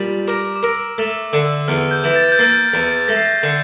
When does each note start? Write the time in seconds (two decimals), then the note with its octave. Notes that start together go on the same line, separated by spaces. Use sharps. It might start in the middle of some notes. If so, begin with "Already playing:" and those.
Already playing: A#2 G3
0.28 A#4 D6
0.56 D6
0.63 A#4 E6
0.98 A3 E6
1.33 D3
1.68 E2 F6
1.91 G6
2.04 E3
2.16 A6
2.32 G6
2.38 A#3 A6
2.74 E2
3.08 A3 A#6
3.17 C7
3.26 A#6
3.43 D3